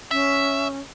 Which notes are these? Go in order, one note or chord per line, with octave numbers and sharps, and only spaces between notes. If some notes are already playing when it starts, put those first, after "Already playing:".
C#4 E5